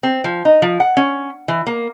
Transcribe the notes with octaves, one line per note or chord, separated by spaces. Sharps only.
C4
F3
D#4
F3
F#5
C#4
E3
A#3